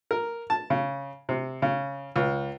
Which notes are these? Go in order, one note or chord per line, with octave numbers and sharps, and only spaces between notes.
A#4
A5
C#3
C3
C#3
C#2